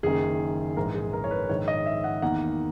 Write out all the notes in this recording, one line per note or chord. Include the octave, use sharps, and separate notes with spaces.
F#1 F#2 D#3 A#3 G#4
A#1 G#2 E3 A#4
G#4
A#4
C#5
B4
A#1 G#2 D#3 C#5
D#5
E5
F#5
E2 D#3 A#3 D#4 F#5